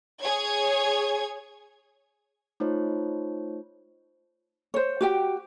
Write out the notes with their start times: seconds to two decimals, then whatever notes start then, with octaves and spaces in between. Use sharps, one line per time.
0.21 G#4 C#5 G#6
2.60 A3 D#4 F4 C5 C#5
4.74 C5 C#5
5.01 F#4 G4 G5